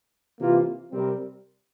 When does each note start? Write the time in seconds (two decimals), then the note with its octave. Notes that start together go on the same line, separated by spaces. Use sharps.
0.38 C3 E3 A#3 F4
0.91 C3 G3 C4 G4 A#4